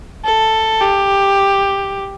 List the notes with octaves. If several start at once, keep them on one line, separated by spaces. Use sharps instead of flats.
A4
G4